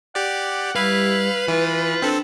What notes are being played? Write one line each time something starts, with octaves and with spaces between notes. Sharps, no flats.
G4 D5 F#5
G3 E4 B4 F5
E3 E4 F4
C4 D4 A4